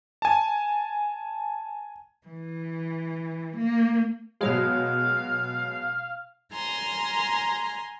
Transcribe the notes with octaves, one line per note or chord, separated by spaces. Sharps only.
G#5 A5
E3
A#3
B2 F#3 G#3 F5
G#5 A#5 C6 F6